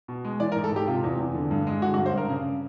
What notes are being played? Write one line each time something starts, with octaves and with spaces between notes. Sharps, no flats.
B2
G#3
E3 D5
A#4
G#2
A4
G#2 G4
C3 F4
E2
E2
D3
G2
G#3
D3 F#4
F#4
G2
C5
G2 A#4
C#3